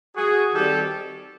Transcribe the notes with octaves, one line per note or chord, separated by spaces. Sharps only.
F#4 G#4
D#3 G3 C4 G4 A4